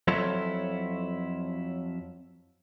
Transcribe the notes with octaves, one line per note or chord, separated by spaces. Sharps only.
F2 F#3 E4 F4 A4 C#5